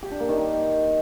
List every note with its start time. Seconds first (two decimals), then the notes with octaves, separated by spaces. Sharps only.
0.03 G4
0.11 D4
0.20 A#3
0.29 D#3
0.38 D#4